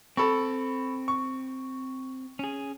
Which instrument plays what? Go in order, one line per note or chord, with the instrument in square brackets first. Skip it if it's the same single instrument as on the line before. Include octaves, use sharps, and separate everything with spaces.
[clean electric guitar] C4 [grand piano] A4 B5 C#6
[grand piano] C#6
[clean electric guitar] C#4 G#4